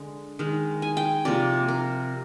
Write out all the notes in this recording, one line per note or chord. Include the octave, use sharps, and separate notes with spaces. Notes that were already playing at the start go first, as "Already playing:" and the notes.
Already playing: D3 G#3
D#3 G#3
G#5
G5
C3 F3 A#3 D5
A#4